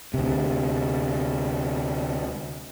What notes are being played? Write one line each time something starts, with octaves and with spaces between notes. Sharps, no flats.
D2 C3